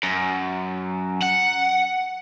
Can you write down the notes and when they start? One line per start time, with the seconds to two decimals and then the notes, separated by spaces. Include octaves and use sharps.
0.03 F#2
1.23 F#5